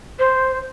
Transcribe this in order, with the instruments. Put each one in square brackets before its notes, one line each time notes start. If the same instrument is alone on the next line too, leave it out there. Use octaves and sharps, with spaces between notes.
[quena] C5